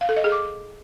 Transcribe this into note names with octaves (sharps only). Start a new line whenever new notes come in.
F5
A4
D#5
G#4
D6